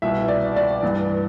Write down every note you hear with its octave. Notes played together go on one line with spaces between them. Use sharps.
C2 B2 E5
D5
D5
G2 E3